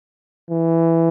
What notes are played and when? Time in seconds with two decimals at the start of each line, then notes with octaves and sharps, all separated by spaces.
0.50 E3